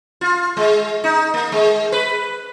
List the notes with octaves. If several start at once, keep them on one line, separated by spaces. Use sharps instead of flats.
F4
G#3
D#4
A#3
G#3
B4